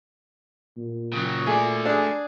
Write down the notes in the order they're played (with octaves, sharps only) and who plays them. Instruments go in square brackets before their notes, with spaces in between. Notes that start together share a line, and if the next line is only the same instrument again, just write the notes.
[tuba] A#2
[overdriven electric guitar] C#3 F#3
[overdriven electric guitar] A3 D5 [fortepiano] G#4
[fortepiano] D4 G#4